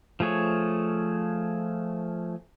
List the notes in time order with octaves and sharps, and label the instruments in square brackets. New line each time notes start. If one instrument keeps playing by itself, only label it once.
[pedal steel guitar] F3 A3 G#4 C#5